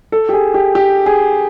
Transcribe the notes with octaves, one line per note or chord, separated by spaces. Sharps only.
A4
G4
G#4
G4
G4
G#4